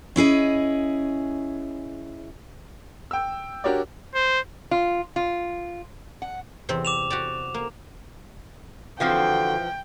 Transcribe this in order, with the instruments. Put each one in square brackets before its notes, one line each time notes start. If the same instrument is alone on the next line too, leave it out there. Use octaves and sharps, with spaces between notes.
[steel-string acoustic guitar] C#4 E4 G#4 D#5
[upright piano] G5 E6
D4 F#4 G4 A#4 C#5 D5
[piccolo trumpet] C5
[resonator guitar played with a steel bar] F4
F4
F#5
[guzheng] E2 C3 C4
[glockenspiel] D6 E7 F7
[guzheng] F#4 G4 D5
A#3
[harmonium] D3 F#4 [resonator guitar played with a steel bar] E3 F3 C4 [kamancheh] G5